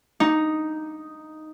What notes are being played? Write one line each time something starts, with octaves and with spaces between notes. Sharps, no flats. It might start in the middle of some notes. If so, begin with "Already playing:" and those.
D#4